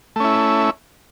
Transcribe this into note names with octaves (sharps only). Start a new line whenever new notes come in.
A3 C#4 E4